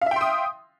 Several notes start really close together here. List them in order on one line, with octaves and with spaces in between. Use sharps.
F5 E5 G5 C6 D#6